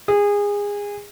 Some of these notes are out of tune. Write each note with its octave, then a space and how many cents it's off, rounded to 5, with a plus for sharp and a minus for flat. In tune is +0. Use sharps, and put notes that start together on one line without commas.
G#4 -25